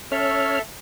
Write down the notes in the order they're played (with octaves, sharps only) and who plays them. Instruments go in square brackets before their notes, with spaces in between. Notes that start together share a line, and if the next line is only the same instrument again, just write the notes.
[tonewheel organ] C#4 C#5 F6 [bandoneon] A4 E5